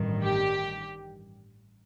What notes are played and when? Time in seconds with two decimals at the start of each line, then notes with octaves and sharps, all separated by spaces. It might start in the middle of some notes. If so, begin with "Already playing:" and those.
Already playing: A1 G2 D#3
0.23 G4